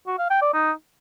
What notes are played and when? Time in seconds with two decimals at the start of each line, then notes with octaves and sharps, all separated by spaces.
0.07 F#4
0.19 F5
0.30 G5
0.42 D5
0.53 D#4